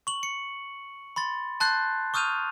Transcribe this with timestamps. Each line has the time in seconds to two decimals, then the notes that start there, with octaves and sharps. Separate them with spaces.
0.07 C#6 F#7
0.23 C#7
1.16 B5 C6 A6
1.60 A5 C6 F#6 G6 A6 C7
2.14 C#6 D#6 F6 G6 D#7 F7